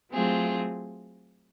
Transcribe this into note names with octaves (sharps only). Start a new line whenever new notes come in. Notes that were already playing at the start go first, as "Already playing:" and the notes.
F#3 A3 C4 F4 G#4